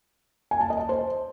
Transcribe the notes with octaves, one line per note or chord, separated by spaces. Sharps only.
G#5
A5
D#5
A5
C5